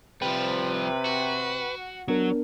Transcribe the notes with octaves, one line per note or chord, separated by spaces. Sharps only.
C3 F3 G3 B4 G5
F#4
F#3 B3 D4 A#4